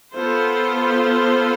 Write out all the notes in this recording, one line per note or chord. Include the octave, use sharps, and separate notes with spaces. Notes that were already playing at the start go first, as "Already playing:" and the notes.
B3 F4 A4 C5